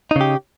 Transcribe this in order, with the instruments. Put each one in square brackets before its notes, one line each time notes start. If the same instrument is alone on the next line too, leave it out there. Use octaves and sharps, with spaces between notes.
[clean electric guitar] D#4
C#3
G4